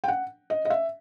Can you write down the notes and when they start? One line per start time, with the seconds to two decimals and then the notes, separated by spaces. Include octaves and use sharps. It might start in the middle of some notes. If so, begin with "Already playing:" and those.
0.04 G5
0.08 F#5
0.50 D#5
0.65 D#5
0.70 E5